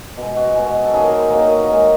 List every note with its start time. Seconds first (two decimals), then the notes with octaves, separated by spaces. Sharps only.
0.17 B2 G#3
0.36 F#4
0.55 B2 G#3
0.85 A4
0.94 D#3 F#3 A#3 G#4
1.06 A#4
1.19 C5
1.31 D#3 F#3 A#3 C#5
1.50 D#5
1.69 D#3 G#3